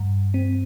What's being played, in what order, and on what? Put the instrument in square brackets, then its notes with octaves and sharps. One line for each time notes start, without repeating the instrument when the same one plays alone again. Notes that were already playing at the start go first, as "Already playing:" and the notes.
Already playing: [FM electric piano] G2
C4